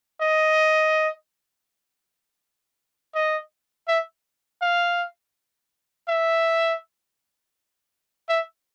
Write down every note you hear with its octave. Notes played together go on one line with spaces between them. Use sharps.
D#5
D#5
E5
F5
E5
E5